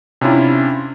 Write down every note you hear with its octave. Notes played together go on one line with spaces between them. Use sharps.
C3 C#4 D4 E4 F4